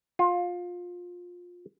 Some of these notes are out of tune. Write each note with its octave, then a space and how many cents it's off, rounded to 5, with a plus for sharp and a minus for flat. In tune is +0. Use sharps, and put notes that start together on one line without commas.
F4 +20